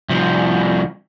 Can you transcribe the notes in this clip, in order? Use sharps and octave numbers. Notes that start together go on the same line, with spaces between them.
C2 F3